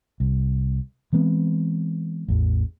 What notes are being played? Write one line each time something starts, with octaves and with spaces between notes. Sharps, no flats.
C2
E3 G#3 B3 C4
A1 E2